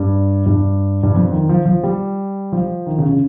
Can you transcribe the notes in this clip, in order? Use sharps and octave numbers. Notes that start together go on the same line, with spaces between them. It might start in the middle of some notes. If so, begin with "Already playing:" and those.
Already playing: G2
G2
G2
F2
D#3
F3
F3
G3
F3
D#3
C#3
C#3